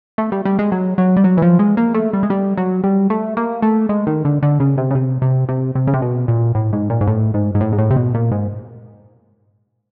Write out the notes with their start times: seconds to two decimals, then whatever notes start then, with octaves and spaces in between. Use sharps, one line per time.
0.18 A3
0.32 G3
0.45 G3
0.59 G#3
0.72 F#3
0.98 F#3
1.17 G3
1.24 F#3
1.37 E3
1.42 F3
1.59 G#3
1.77 A#3
1.94 A3
2.13 G3
2.23 G#3
2.30 G3
2.57 F#3
2.84 G3
3.10 A3
3.37 A#3
3.62 A3
3.89 G#3
4.07 D#3
4.25 D3
4.42 D3
4.60 C#3
4.78 C3
4.90 C#3
4.95 C3
5.22 C3
5.49 C3
5.75 C3
5.87 C#3
5.94 C3
6.02 B2
6.28 A#2
6.55 A2
6.73 G#2
6.90 A#2
7.01 G#2
7.07 A2
7.34 G#2
7.55 G#2
7.61 A2
7.72 G#2
7.78 A2
7.90 C3
7.96 B2
8.14 A#2
8.31 G#2